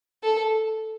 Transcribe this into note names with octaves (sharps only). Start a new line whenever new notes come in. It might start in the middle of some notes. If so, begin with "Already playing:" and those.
A4